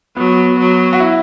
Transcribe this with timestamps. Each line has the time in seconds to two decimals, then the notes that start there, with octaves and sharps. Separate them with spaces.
0.17 F#3 B3
0.59 F#3
0.93 F#4
1.00 E4